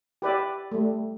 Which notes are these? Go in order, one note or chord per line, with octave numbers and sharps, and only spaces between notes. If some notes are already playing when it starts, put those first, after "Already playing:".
G4 B4 D5 E5
G3 A3